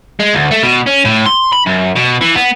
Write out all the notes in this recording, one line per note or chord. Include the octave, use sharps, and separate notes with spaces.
G#3
D2
A3
B2
C#4
A2
C6
B5
F#2
B2
E3
B3